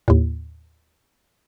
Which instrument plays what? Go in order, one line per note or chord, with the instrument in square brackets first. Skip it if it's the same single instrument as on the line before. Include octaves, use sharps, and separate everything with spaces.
[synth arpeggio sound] D#2 A2